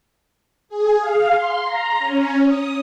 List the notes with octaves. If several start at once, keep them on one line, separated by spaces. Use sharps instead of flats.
G#4
F5
C6
A#5
C#4
D#6